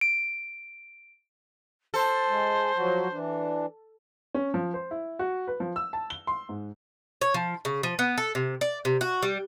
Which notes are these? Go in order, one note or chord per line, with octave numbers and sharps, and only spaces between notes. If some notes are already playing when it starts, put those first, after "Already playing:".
D7
A4 C5
G#3
F3 F#3 F#4
E3 D4
C#4
F3
C5
E4
F#4
B4
F3
E6
A5
G7
C6
G#2
C#5
F3
C#3
F3
B3
A4
C3
D5
C3
F#4
G3